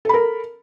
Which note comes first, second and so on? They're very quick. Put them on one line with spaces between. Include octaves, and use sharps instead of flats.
A4 B5 A#4